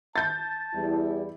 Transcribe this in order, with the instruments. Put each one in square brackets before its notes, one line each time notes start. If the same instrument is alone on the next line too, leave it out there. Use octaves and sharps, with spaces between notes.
[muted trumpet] A5 [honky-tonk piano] G6 A6
[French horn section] E2 G3 E4